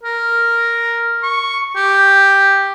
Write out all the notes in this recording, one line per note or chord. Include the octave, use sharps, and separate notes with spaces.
A#4
C#6
G4